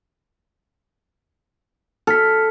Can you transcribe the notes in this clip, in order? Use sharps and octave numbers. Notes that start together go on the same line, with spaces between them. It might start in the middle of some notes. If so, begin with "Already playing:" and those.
A4 F6 B6